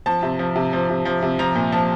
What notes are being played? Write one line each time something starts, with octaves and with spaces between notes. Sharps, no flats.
F3 A5
C3
F3
C3
F3
C3
F3
C3
F3 A#5
A#2
F3 A5